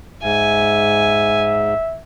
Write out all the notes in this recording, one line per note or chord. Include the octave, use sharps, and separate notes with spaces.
G#2 E5 G#5